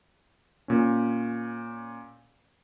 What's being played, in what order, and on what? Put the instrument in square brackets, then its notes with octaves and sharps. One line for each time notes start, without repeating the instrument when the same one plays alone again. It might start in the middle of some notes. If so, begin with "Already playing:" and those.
[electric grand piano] A#2 C#4